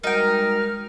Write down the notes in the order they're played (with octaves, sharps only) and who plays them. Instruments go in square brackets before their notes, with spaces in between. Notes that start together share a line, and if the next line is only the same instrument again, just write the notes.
[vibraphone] G3 G#3 F#4 [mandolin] D#4 G5 [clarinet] A#4 [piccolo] F6